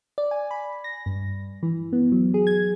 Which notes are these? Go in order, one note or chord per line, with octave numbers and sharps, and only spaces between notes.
D5
G#5
B5
A#6
G2
E3
B3
F#3
G#4
G#6